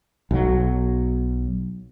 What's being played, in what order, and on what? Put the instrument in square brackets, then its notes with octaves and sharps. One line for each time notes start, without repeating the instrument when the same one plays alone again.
[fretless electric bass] B1 F#3